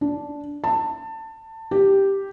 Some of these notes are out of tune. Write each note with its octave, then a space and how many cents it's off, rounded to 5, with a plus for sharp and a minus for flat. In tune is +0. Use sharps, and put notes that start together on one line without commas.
D4 -10
A5 +20
G4 +0